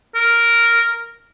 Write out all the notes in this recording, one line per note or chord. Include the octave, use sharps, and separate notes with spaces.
A#4